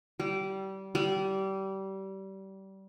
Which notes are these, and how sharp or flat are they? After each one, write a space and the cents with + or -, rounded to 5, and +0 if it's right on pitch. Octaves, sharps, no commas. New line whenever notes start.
G3 -25
G3 -25